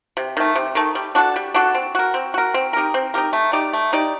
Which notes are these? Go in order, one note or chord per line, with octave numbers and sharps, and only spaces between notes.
C3
D#3 A3
C3
D#3 A3
G3
D4 F#4 A4
G3
D4 F#4 A4
C4
F#4 A#4
C4
F#4 A#4
C4
D#4 G4 A#4
C4
D#4 G4 A#4
A3
D#4 G4 D5
A3
D#4 G4 D5